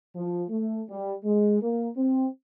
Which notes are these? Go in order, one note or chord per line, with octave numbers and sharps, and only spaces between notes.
F3
A3
G3
G#3
A#3
C4